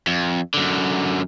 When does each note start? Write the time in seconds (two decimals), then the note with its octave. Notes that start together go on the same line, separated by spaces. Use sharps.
0.07 F2
0.54 F#2 D3